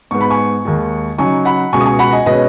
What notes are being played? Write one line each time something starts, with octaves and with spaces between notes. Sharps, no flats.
G#2 G#3 B3 C#6
B5
G#5 C#6
D#2 D#3 G#3
C#3 F#3 D#4 G#5 C#6
F#5 B5
C#2 B2 G#3 G#5 C#6
D#6
G#5 C#6
F#5 B5
D#5 G#5
B2 G#3 C#4 B4 D#5